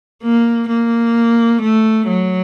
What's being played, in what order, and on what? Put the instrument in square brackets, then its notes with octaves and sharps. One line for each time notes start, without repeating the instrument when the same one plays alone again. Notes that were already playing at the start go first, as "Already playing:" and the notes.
[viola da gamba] A#3
A#3
A3
F#3